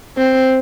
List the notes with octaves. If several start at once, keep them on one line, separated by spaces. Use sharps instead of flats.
C4